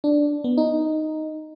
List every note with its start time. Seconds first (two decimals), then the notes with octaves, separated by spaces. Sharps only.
0.04 D4
0.44 B3
0.58 D#4